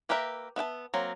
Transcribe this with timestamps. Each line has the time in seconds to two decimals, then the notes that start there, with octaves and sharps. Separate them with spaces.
0.09 A#3 G4 A#4 B4 E5
0.56 B3 E5 G5 A5
0.94 F#3 A#3 C4